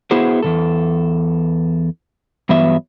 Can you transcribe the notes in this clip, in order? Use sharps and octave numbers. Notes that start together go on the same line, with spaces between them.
B3 E4 F#4 G#4 C5
E2 B2 A4
G2 E3 F#3 B3 E5